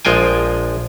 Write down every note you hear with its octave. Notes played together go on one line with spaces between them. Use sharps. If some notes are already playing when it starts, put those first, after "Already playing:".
A#1 F3 G#3 F4 G5 G#5